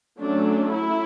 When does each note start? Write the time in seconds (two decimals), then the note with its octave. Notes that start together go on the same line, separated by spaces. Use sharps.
0.21 F#3 A3 C#4 D4
0.74 E4